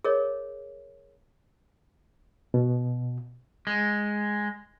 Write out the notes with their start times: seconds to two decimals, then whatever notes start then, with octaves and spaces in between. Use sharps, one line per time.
0.04 G#4 A#4 C#5 D#5
2.54 B2
3.67 G#3